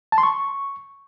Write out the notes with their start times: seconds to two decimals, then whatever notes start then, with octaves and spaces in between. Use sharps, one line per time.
0.12 A5
0.18 C6
0.23 C#6